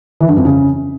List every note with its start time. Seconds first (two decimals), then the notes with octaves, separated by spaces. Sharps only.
0.21 E3
0.29 G2
0.37 F2
0.45 C#3